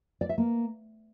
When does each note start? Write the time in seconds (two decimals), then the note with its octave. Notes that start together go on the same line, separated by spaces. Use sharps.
0.21 D5
0.29 E5
0.38 A#3